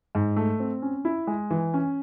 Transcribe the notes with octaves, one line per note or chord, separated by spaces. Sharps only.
G#2
A3
C4
C#4
E4
G#3
E3
C#4